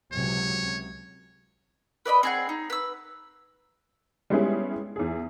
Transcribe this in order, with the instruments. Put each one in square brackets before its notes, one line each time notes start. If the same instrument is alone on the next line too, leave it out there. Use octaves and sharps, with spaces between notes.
[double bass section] C#2 C3 F#3 [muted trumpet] C#5
[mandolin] B4 D5 D#5 B5
C4 G#4 F#5
D#4
B4 E6
[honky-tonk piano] G3 G#3 B3 C#4 E4 G#4
E2 G#4